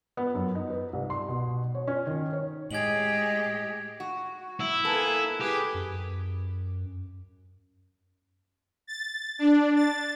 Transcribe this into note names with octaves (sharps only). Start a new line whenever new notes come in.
B3
F#2
D#4
B4
C2
C6
B2
C#5
C#4
D#3
C#5
A2 G#3 G4 G#4 D#5 G#6 F#7
F#4
E4
A#3 B3 A4 G#5
G4 G#4 B4
F#2
A6
D4
A6